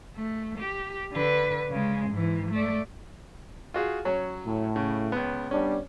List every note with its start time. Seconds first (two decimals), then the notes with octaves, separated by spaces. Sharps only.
0.16 A3
0.59 G4
1.13 D3 B4
1.71 C#3 G#3
2.11 G#2 E3
2.51 A3 D5
3.74 F4 F#4 G#4
4.05 F#3 C#4
4.45 A2
4.76 C#3
5.12 C#2 B3
5.51 G3 B3 C#4 D4